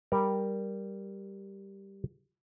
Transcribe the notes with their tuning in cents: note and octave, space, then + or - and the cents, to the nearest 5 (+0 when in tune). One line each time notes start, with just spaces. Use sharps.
G3 +0 A#4 +0